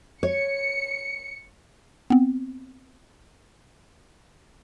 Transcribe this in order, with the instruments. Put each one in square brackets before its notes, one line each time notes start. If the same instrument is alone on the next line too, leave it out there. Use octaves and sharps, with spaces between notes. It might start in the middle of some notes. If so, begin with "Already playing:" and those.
[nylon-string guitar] C#5 [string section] C#7
[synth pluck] B3 C4